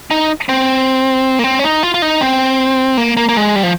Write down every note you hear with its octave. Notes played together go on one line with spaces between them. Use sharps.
D#4
C4
A#3
C4
C#4
D#4
F4
F4
D#4
C4
A#3
A#3
A#3
G#3
G3
F3